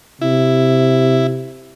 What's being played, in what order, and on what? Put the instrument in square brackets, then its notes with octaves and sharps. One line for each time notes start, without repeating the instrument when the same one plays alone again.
[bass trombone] C3 [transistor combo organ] E4